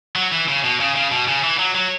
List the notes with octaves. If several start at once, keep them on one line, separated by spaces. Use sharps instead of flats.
F#3
E3
C#3
B2
C#3
C#3
B2
C#3
E3
F#3
F#3